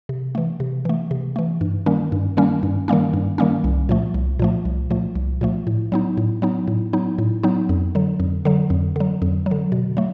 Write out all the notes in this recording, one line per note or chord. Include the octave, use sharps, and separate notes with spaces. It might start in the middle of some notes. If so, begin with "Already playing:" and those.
C3
E3 A3
C3
E3 A3
C3
E3 A3
G2
D#3 G3 A#3 C#4
G2
D#3 G3 A#3 C#4
G2
D#3 G3 A#3 C#4
G2
D#3 G3 A#3 C#4
C2
A#2 F3 A3
C2
A#2 F3 A3
C2
A#2 F3 A3
C2
A#2 F3 A3
A2
F#3 B3 D#4
A2
F#3 B3 D#4
A2
F#3 B3 D#4
A2
F#3 B3 D#4
F2
D3 F#3
F2
D3 F#3
F2
D3 F#3
F2
F#3
D3
B2
F#3 A3